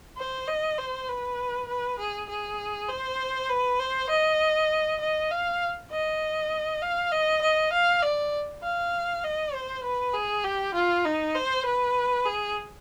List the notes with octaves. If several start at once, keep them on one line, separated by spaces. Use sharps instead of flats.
C5
D#5
C5
B4
B4
G#4
G#4
C5
B4
C5
D#5
D#5
F5
D#5
F5
D#5
D#5
F5
D5
F5
D#5
C5
B4
G#4
G4
F4
D#4
C5
B4
G#4